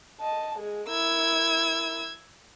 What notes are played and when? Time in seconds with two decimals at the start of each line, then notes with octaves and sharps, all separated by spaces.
0.21 D#5 A5
0.58 G#3 G#4
0.90 E4 A#4 E6 G#6